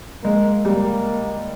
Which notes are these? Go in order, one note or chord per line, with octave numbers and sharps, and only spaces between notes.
G#3 A#3
G3 A#3